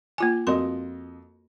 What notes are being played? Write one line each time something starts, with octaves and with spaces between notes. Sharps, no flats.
A#3 F4 G#5
F2 F#4 A#4 D#5 C6